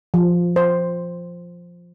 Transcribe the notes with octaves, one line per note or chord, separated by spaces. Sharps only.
F3
C5